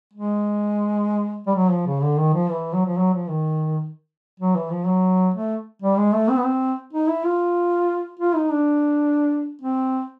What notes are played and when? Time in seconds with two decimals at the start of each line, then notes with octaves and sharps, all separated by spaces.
0.13 G#3
1.46 G3
1.55 F#3
1.71 F3
1.86 C#3
2.02 D3
2.18 D#3
2.34 F3
2.50 E3
2.74 F#3
2.86 F3
2.98 F#3
3.14 F3
3.29 D#3
4.40 F#3
4.56 E3
4.71 F3
4.87 F#3
5.34 A3
5.82 G3
5.98 G#3
6.13 A3
6.30 C4
6.37 B3
6.44 C4
6.93 D#4
7.08 E4
7.24 F4
8.19 F4
8.35 D#4
8.51 D4
9.62 C4